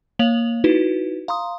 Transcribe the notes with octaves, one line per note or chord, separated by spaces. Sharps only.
A#3 C#5 F5 F7 F#7
D#4 E4 F#4 B4
F5 A#5 C6 D#6